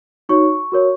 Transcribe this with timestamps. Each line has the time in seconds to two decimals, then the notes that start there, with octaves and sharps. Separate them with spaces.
0.29 D#4 F#4 C#5 C#6
0.72 F#4 A#4 C#5